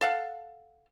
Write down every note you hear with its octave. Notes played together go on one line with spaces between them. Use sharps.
A4 F5 F#5